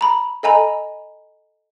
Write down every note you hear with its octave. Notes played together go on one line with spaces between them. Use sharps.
A#5 B5
A4 D#5 G#5 A#5 B5